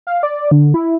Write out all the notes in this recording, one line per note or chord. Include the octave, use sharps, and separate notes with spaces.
F5
D5
D3
E4